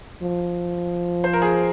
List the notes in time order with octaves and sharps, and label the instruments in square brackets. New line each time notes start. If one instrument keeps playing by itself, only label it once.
[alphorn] F3
[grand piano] C5
A#4
G#4